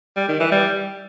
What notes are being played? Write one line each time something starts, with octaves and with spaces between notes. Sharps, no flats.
G3
D#3
E3
G3